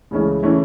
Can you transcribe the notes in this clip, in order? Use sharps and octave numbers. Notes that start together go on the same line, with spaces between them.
C#2 C#3 E3 A3 C#4
C#3 E3 A3 C#4